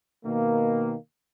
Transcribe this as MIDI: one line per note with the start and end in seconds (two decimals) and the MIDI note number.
0.25 0.95 47
0.25 0.95 51
0.25 0.95 58